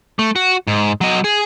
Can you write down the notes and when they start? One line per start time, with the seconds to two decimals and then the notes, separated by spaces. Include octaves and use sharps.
0.19 A3
0.36 F#4
0.67 G#2
1.01 F#3 D#5
1.24 G#4